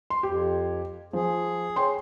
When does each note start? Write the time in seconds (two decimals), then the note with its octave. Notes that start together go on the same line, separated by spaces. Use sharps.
0.10 C6
0.23 F2 G4
1.13 F3 G#4
1.76 C#5 G5 C6